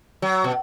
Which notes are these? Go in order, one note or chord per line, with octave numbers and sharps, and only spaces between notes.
F#3
B2